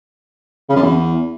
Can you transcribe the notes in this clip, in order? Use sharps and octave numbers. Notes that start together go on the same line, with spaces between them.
C#3
F#2
E2